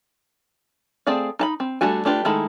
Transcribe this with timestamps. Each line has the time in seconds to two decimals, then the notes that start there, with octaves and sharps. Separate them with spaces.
1.07 A3 C4 G#4 D5 F5
1.39 D#4 A5 B5
1.60 C4
1.81 G3 A3 D4 F#4 G#5
2.05 A3 D4 F4 G4 B4
2.25 D#3 G#3 A3 E4 B5